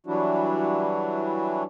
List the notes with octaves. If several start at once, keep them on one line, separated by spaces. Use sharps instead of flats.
E3 F#3 G3 D4 E4 F#4